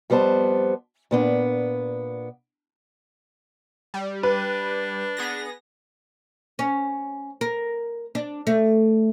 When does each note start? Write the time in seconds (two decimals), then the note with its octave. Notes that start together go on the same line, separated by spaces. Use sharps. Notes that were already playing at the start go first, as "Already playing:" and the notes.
0.10 F2 G3 B3 C5 A5
1.11 A#2 B3 D4
3.94 G3
4.23 D4 B4
5.17 B3 G#4 A#6
6.59 C#4
7.41 A#4
8.15 D4
8.47 A3